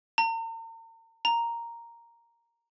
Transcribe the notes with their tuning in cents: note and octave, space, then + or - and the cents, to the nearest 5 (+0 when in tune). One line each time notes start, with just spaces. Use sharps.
A#5 -45
A#5 +0